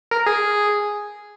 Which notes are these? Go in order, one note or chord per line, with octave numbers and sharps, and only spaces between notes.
A#4
G#4